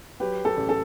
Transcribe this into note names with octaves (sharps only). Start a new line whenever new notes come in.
F#3 G4 B4
A4
A1
A4